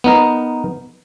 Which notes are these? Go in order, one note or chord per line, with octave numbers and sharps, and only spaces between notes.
B3 D#4 A#4